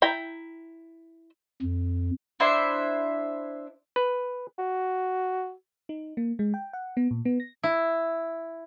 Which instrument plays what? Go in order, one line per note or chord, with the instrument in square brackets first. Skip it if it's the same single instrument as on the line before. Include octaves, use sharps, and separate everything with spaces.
[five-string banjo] E4 G5 A#5
[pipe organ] F2
[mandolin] D4 E4 C5 E5
[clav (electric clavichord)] B4
[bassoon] F#4
[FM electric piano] D#4
A#3
G#3
G5
F#5
B3
A#2
B3
A#6
[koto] E4